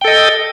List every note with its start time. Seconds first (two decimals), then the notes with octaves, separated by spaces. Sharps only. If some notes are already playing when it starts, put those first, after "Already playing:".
0.01 G5
0.04 A4
0.08 D#5